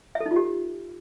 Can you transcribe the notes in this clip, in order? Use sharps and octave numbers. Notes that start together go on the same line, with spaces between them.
E5
A4
D#4
F4
G4